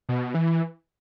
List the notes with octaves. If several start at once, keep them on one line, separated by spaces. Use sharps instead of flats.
B2
E3